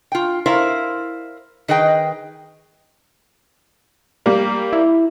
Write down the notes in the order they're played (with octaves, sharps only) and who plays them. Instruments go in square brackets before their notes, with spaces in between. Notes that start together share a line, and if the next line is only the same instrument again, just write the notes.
[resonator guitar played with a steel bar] F4 G5
E4 A#4 C5 D5 F5
D#3 G#4 B4 D#5 G5
[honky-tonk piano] G3 A#3
[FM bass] E4